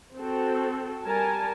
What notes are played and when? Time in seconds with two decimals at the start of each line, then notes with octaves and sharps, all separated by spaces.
0.16 C4 F#4 A4
1.05 G3 A#4 G#5 A5